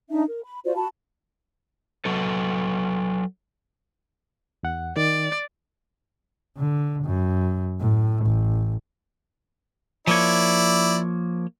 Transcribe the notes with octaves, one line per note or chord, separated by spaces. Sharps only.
D4 D#4 E5
A#4
B5
F4 F#4 C5 D5
F#4 A5 B5
F#3 A4 B4
E2 F#5
D#3 D5
D3
F#2
A2
A1
F3 A#3 E4 C#5 D5